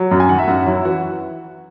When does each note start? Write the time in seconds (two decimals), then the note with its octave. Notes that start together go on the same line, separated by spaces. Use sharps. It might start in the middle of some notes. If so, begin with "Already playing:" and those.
Already playing: F#3
0.11 F#2
0.20 G#5
0.29 D#3 F#5
0.39 E5
0.47 F#2 F#4
0.66 F#3 E4
0.85 E3 F#4